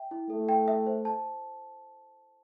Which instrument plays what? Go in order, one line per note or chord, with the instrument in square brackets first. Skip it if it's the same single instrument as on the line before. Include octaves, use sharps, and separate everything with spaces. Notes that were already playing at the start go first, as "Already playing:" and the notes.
Already playing: [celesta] E5 G5
E4
[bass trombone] A3 [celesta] A4
[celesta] G5
E5
C5
A5